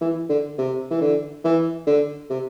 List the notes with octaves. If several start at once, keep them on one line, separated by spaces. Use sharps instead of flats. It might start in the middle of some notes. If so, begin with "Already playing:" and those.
E3
D3
C3
E3
D3
E3
D3
C3